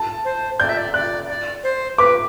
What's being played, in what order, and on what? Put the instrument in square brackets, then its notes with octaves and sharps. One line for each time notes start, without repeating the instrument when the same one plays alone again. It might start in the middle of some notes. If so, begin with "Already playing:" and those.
Already playing: [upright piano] A5
[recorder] C5
[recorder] D5 [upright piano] G6
[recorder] E5
D5
[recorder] D5 [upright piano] F#6
[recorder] D5
C5
[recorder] B4 [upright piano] D6